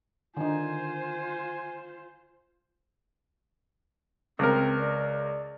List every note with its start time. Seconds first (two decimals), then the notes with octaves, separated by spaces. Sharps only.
0.37 D3 D#3 D#4 F4 C5 G#5
4.39 C#2 C4 A#4
4.79 D5